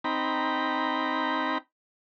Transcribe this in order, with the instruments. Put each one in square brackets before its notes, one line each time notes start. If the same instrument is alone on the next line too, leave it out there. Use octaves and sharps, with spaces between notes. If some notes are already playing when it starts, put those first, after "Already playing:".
[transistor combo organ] C4 D#4 G5 A#5 B5